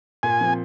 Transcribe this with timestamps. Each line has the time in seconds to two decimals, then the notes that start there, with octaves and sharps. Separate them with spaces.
0.23 A#2 G#5
0.41 F3 C4